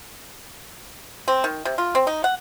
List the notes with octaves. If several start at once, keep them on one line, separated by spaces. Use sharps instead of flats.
C4
D#3
C3
F4
C4
D#4
F#5